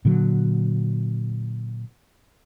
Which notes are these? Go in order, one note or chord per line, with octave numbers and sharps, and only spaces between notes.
A#2 D3 F#3